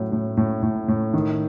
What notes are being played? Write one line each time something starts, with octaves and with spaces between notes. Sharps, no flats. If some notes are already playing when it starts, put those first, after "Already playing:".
Already playing: A2 F#3
A2
A2
A2
A2
D#3